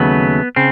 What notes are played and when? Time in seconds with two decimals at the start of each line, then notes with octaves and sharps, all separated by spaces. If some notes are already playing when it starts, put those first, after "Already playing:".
Already playing: D#2 C#3 F#3 A3 B3
0.56 C#3 C4